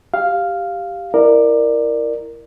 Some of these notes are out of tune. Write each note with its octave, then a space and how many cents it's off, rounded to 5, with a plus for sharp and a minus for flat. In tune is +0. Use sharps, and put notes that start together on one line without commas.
G4 +0 F5 +0
E4 +0 A#4 +0 D5 +20